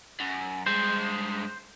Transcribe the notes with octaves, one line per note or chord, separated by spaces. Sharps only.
F#2
G2 G#3 C5